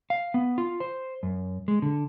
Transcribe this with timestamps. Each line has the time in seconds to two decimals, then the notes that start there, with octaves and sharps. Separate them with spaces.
0.10 F5
0.34 B3
0.58 F4
0.80 C5
1.23 F#2
1.68 G#3
1.82 D3